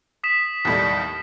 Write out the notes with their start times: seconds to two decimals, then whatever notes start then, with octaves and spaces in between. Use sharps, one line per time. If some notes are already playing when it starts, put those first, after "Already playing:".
0.24 D#6 B6 E7
0.65 D#2 A2 G3